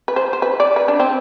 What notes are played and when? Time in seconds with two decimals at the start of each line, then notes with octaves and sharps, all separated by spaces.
0.08 B4
0.16 C5
0.33 C5
0.42 B4
0.60 D5
0.76 B4
0.88 D4
1.00 C4